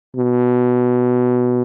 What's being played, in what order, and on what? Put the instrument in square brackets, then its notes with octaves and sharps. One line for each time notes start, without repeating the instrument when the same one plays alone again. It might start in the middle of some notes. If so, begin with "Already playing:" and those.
[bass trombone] B2